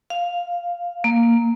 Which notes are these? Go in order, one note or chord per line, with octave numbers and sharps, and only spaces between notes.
F5
A#3